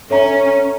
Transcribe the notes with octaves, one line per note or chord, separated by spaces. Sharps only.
C#4 A4 C#5 E5 A#5